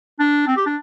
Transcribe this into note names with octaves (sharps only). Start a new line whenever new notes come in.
D4
C4
G4
D4